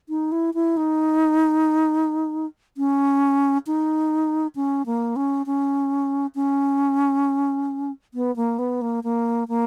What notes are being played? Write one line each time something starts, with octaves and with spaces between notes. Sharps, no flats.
D#4
E4
E4
D#4
C#4
D#4
C#4
A#3
C#4
C#4
C#4
B3
A#3
B3
A#3
A#3
A#3